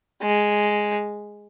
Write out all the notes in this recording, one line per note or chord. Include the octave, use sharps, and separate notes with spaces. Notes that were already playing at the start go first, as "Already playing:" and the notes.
G#3